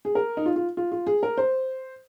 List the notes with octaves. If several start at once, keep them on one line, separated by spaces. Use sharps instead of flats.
G#4
A#4
D#4
F4
F4
F4
F4
G#4
A#4
C5